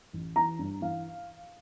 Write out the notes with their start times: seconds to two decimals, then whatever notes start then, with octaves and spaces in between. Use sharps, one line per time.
0.13 A1
0.36 E3 A#5
0.59 G2
0.81 E3 F5